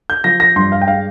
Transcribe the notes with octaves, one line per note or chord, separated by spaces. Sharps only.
G6
F3 A#6
A#6
G2 C6
F5
G5
G#3 F5